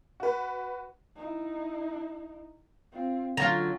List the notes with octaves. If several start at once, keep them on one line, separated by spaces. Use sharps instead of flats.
F#4 B4
D#4 E4
C4 F4
D3 F#3 C#4 F4 A#5